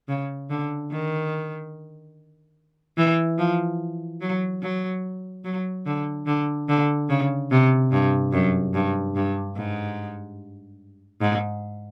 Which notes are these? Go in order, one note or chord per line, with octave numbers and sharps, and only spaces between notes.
C#3
D3
D#3
E3
F3
F#3
F#3
F#3
D3
D3
D3
C#3
C3
G2
F#2
G2
G2
G#2
G#2